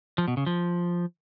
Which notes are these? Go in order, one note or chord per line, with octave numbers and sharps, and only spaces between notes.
F3
B2
C#3
F3